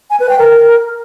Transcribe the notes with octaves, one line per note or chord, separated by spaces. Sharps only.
G#5
B4
G5
A#4